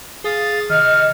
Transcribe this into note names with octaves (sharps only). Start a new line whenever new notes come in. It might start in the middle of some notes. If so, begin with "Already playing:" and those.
G#4 F5 D#6 A6
C3 D#3 D#5 F6